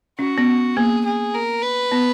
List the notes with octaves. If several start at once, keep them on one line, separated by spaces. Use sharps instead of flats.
C#4 F#4
B3
A#3 G#4
G#4
A#4
B4
B3